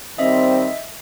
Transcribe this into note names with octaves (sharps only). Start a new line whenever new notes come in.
D#3 G3 C4 D#5 E5